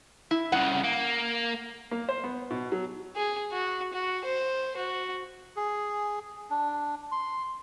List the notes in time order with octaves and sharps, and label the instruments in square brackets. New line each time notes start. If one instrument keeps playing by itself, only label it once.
[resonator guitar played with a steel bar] E4
[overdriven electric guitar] C2 C#3 [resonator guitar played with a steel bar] F#5
[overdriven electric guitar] A#3
[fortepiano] A#3
C5
B3
B2
F#3
[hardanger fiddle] G#4
F#4
F#4
C5
F#4
[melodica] G#4
D4
C6